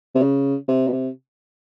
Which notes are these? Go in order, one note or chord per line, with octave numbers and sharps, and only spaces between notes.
C3
C#3
C3
B2
C3